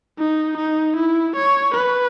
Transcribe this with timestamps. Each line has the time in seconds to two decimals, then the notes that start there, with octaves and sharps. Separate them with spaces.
0.19 D#4
0.57 D#4
0.97 E4
1.36 C#5
1.75 B4